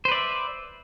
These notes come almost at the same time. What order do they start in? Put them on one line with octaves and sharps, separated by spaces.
C5 B4 D5 E5